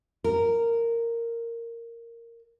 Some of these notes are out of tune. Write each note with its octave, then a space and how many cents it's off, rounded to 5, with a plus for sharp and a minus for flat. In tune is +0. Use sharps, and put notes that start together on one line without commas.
A#4 -10